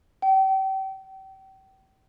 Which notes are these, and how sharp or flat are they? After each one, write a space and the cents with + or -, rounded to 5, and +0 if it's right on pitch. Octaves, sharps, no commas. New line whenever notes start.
G5 -35